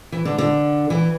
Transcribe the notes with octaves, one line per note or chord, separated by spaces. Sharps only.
E3
D3
D3
E3